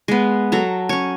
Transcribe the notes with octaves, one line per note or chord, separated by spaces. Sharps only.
G#3 B3
F#3 A4 A#5
C#4 C#5